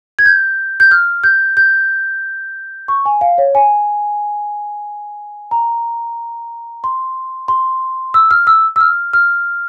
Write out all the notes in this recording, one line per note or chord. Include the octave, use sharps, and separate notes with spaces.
G#6
G6
G6
F6
G6
G6
C#6
G#5
F5
C#5
G#5
A#5
C6
C6
E6
F6
E6
E6
F6
F6